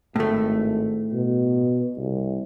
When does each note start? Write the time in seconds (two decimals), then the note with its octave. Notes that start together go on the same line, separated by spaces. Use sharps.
0.16 G#1 A2 A3
1.13 B2
1.98 C2